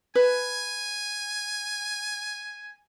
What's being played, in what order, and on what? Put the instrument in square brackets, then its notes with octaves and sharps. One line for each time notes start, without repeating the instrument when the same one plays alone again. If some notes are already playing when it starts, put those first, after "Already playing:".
[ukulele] B4 [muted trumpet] G#5